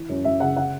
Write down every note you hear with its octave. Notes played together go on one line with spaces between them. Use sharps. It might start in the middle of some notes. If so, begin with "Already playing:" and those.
Already playing: E3
F#2
F#2 E5
C#3 F#5
F#5